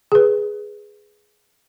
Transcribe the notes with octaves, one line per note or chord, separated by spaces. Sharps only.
G#4 B4